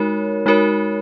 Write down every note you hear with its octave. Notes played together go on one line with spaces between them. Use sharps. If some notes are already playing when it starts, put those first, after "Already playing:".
Already playing: G#3 D#4 F#4 A#4 C#5
G#3 D#4 F#4 A#4 C#5